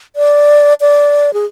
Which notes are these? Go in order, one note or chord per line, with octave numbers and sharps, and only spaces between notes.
D5
D5
G#4